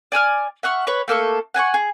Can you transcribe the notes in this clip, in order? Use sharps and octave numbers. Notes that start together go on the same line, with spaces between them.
D5 G#5 E6 F6
E5 F#5 C#6 F6
B4 C#5 B5
A3 A#3 A4 C#6
F#5 G#5 A5 C#6
G#4